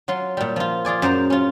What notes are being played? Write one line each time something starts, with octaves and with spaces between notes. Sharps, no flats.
F#3 F4 C6
A#2 G3
F3 F4
F4 G#4 D5 G#5
F#2 C5 A#5
C#4 F4